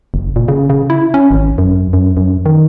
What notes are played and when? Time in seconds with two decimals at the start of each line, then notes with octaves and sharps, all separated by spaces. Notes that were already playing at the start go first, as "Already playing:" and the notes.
0.14 F#1
0.36 A#2
0.48 C#3
0.70 C#3
0.90 E4
1.14 C#4
1.31 G#1
1.58 F#2
1.93 F#2
2.17 F#2
2.46 D#3